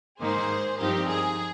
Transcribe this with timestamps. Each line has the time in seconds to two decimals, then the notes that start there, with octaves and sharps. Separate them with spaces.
0.20 G#2 D#3 A#3 D#4 G#4 C5
0.80 G2 F3 C4 D#4 G4 A#4
1.10 G#4